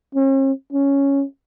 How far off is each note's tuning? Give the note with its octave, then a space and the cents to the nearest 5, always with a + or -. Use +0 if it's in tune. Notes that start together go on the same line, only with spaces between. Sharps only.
C#4 -45
C#4 +0